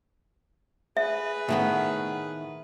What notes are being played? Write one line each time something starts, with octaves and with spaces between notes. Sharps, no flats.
G#4 B4 E5
A2 D#3 B3